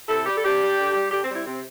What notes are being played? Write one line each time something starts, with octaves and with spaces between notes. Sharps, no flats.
C3 E4 A4
G3 G4
A4
C3 D4 G4
G3
D3
G3
D3 D4 G4
C4
G3
C4 E4
C3 C4